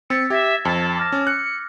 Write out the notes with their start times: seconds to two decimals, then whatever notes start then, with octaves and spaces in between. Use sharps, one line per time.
0.10 C4 E6 A6 B6 C#7
0.30 G4 E5 E6 G#6 A#6
0.65 F2 A5
0.97 D6 F6 A#6
1.12 C#4
1.27 F#6 C#7